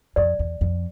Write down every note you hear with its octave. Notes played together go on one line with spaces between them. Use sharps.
F2 D5
E2
F2